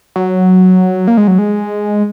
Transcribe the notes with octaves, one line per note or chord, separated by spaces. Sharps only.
F#3
A#3
G#3
F#3
G#3